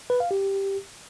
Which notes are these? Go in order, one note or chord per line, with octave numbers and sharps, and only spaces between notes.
B4
F5
G4